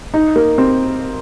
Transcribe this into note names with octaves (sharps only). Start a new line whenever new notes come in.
D#4
A#3
C4